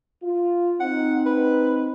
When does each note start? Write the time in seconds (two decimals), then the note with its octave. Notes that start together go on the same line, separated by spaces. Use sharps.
0.23 F4
0.80 C4 D#4 F#5
1.26 B4